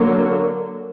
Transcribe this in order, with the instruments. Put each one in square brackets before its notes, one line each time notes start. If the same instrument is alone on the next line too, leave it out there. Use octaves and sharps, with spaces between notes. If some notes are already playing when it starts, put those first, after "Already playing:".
Already playing: [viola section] D3 F#3 A#3